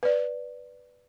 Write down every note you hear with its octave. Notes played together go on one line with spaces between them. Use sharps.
B4 D5